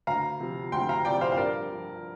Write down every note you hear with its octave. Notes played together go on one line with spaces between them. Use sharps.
D2 F5 A#5
C3 F3
D2 G5 C6
F5 A#5
C3 F3 D5 G5
C5 F5
F5
G2 A#4 D5
F3